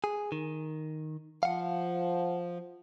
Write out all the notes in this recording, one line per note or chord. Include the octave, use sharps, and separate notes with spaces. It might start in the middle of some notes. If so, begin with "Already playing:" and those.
G#4
D#3
F3 F5 F#5